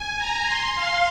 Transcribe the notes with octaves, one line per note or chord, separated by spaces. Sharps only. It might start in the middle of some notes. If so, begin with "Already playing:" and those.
Already playing: G#5
A#5
C6
F5